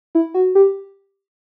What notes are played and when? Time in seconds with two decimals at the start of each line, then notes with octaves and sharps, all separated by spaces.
0.15 E4
0.34 F#4
0.55 G4